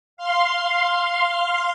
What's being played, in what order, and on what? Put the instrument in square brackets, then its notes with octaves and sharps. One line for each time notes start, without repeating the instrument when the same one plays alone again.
[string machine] F5 C6